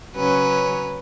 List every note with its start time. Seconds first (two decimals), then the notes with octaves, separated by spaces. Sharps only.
0.16 C#3 F#3 C#4 B4